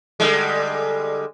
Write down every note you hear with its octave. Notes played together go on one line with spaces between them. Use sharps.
D3 G3 G#3